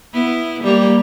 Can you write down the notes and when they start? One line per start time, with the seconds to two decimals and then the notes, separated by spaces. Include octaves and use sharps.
0.13 B3 E4
0.63 G3 A#3